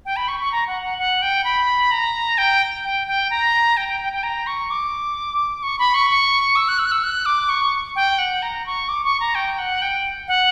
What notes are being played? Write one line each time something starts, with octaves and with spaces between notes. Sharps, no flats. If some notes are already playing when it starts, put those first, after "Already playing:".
G5
B5
C#6
C#6
A#5
F#5
F#5
F#5
G5
B5
A#5
G5
G5
G5
A#5
G5
G5
G5
G5
A#5
C#6
D6
C#6
B5
C#6
C#6
E6
F#6
E6
F#6
E6
F#6
D6
C#6
G5
F#5
A#5
C#6
D6
C#6
A#5
G5
F#5
G5
F#5